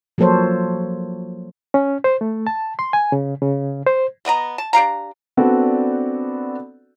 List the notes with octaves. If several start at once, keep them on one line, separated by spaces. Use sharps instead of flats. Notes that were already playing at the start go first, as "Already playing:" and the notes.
F3 F#3 A#3 A4 C5 C#5
C#4
C5
A3
A5
C6
G#5
C#3
C#3
C5
A3 B3 D#5 A#5
A5
D4 G4 F5 A#5
B3 C4 D4 F#4 A4 D5